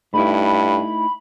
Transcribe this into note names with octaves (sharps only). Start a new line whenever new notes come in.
G2 A3 D#4 E4 B5